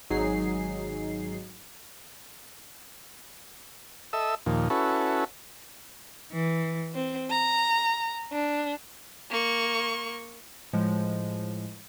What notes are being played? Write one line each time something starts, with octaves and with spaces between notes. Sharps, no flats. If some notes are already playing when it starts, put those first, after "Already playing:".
G#1 F#3 D#4 G#4 C7
A4 D#5 E5 E6
D#2 A#2 F3
C#4 E4 F#4 A4 B4
E3
C4
A#5
D4
A#3 C#6
A2 F3 G#3